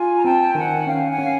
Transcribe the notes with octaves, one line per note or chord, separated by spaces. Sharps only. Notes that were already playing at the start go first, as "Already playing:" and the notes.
Already playing: F4 G#5
A#5
C4 G5 A5
D#3 F#5 G#5
C#4 F5 G5
F#5 G#5
C#4 F5